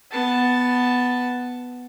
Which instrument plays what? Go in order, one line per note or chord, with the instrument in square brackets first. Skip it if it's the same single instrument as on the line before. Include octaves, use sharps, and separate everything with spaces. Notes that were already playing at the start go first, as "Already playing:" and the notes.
[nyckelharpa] B3 A5